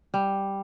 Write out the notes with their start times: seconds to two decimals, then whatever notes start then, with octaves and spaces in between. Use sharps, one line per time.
0.14 G3